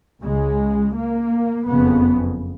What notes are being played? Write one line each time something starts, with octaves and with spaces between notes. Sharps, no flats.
C#2 C#3 G#3
A#3
F#1 F2 C#3 B3